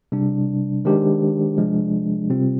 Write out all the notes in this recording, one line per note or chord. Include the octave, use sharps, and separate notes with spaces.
C3 G3 D4
D#3 G#3 D4 G4 C5
C3 F3 G#3 D4
C3 G3 C4 F4